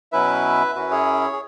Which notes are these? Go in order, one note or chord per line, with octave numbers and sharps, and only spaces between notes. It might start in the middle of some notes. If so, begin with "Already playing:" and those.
B2 F#3 C#4 E4 B4 E5
F#2 F#3 C#4 E4 F#4 B4
G#4 C#5
G#4